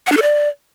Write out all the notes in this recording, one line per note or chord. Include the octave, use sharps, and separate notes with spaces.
F#5
D4
A4
D5